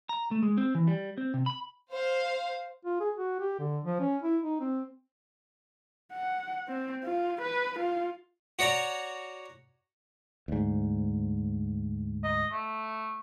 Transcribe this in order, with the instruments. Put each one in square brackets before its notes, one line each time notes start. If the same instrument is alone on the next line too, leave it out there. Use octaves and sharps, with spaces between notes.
[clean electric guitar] A#5
A3
G#3
C4
E3
G3
C4
C3
B5
[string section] C5 F5
[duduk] F4
G#4
F#4
G4
D3
F3
C#4
E4
D#4
C4
[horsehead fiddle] F#5
C4
F4
B4
F4
[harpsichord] F#4 C#5 D5 A#5
[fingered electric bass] D2 G#2
[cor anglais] D#5
A3